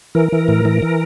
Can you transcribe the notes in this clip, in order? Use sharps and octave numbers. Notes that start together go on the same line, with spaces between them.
E3 A#4
E3
A2
E3
E3